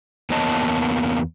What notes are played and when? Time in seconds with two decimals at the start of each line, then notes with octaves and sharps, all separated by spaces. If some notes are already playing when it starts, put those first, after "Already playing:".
0.30 E2 A#3 B3 C#5 D#5 A5